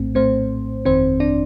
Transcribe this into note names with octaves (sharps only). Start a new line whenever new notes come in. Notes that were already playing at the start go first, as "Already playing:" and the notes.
Already playing: A#1 A2 A3 C4
A#1 A2 A3 C4 C5
G1 F2 D#3 C4 C5
D4 D5